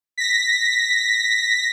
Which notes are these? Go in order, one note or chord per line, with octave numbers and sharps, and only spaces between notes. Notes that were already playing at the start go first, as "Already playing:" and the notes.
A#6 B6